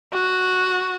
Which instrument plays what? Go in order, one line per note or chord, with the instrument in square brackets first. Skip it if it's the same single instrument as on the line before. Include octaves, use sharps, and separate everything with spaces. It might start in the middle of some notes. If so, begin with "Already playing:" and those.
[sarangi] F#4